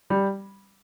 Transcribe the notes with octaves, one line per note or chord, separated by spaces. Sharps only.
G3